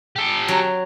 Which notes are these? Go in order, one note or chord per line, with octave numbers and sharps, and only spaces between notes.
G4 A4
F#3